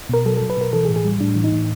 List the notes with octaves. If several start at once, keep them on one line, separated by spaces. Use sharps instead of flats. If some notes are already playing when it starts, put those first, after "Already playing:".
B2 A#4
F#3 A4
F#3 A4
B4
B2 A#4
E3 A4
G#4
A2
G#4
G3
A2 D4
E3
D#4
A2